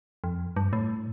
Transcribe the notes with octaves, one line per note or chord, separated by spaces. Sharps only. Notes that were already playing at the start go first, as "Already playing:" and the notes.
F2
G2
A2